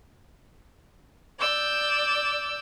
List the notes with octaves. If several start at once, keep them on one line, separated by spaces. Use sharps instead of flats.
D5 E6 G6